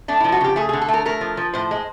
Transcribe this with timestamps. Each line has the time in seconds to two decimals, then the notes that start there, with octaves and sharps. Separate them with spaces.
0.08 A3 D4
0.20 E4
0.24 F3
0.32 F#4
0.41 C#3 G4
0.56 A3 G#4
0.69 G#4
0.73 D3
0.82 A4
0.89 A3
0.94 A#4
1.06 A3 A#4
1.21 F3
1.37 F3
1.53 A2 C5
1.71 G#3